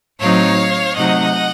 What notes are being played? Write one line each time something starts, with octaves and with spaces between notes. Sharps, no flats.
A2 F#3 C4 D#4 C#5 F5
C3 F#3 A3 D#4 D#5 F#5